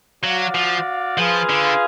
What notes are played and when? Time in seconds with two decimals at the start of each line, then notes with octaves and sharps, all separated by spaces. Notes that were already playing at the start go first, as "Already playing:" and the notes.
0.23 F#3 F#4 D5 F5
0.54 F3
1.18 F3 F4 G#4 B4 F5
1.50 D3